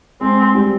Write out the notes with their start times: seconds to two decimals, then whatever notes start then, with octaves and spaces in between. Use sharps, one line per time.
0.21 G#3 C4
0.55 G3